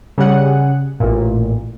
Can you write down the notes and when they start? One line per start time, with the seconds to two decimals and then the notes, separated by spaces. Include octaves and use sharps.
0.18 C#3 G3 G#4 F#5
1.00 A1 A#2